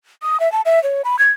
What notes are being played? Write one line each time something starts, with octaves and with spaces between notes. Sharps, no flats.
D#6
E5
A5
E5
C#5
B5
G#6